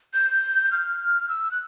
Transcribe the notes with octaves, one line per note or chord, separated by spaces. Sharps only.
G6
F6
E6
F#6